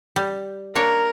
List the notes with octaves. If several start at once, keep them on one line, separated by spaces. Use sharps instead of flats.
G3
A#3 D4 A#4 C#5